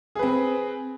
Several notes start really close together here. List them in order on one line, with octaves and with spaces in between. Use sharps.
G#4 B4 C4